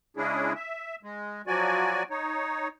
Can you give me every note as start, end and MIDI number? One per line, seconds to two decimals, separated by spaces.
0.17 0.53 49
0.17 0.53 56
0.17 0.53 61
0.17 0.53 62
0.17 0.53 64
0.17 0.53 68
0.55 0.96 76
1.03 1.42 56
1.47 2.03 53
1.47 2.03 54
1.47 2.03 66
1.47 2.03 74
1.47 2.03 80
2.10 2.68 63
2.10 2.68 73